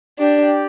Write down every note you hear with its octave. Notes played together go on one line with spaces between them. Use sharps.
D4 G4 D5 G5